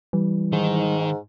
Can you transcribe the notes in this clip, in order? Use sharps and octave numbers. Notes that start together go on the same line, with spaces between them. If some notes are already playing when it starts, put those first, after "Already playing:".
E3 G3
G#2 D#3